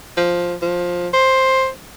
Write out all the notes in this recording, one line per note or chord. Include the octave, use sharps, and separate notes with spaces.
F3
F3
C5